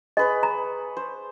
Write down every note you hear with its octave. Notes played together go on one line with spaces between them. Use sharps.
G#4 B4 C#5 D#5
A#5
C5